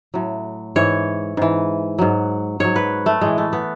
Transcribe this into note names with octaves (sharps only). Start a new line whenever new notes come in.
A2 F#3
G#2 E3 C#5
G#2 E3
G#2 F#3
G#2 F#3 C#5
B4
A3
A2 E3 G#3
A3
B3